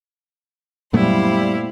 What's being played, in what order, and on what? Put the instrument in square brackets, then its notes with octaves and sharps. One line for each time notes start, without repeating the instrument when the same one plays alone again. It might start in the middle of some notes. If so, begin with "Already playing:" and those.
[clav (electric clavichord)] F#2 [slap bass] A#2 A3 B3 [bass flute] G3 [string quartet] E4 C5 F5